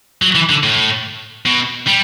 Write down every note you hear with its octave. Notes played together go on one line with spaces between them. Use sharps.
F#3
E3
D3
A2
B2
G3